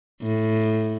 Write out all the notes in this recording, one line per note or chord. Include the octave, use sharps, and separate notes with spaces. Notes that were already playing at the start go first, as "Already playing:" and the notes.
A2